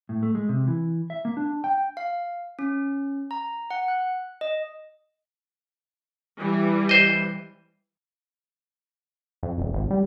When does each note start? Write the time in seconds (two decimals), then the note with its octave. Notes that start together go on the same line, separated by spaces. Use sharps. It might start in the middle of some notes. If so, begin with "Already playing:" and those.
0.09 A2
0.23 A3
0.35 G#3
0.49 C3
0.68 E3
1.10 E5
1.25 A#3
1.37 D4
1.64 G5
1.97 F5
2.59 C#4
3.31 A#5
3.71 F#5
3.88 F#6
4.41 D#5
6.40 E3 G3
6.89 C5 D#5
9.43 F2
9.59 D#1
9.74 G#1
9.90 G3